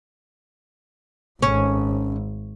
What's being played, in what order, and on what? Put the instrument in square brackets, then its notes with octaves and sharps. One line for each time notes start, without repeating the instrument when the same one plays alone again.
[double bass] G#1 [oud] C#4